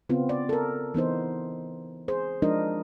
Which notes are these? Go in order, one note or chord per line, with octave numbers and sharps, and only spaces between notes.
C#3 B3 C4 F4
D5
A4 A#4
E3 B3 D#4 C5
G#4 C5
F3 G#3 D4 D#4 A#4 D#5